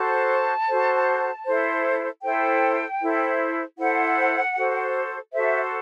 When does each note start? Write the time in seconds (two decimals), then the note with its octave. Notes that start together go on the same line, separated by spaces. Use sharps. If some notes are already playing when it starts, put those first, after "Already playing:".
Already playing: F#4 A4 C5 A5
0.68 F#4 A4 C5
1.46 E4 A4 C5
2.23 E4 A4 C5 G5
3.00 E4 A4 C5
3.78 E4 A4 C5 F#5
4.56 F#4 A4 C5
5.33 F#4 A4 C5 E5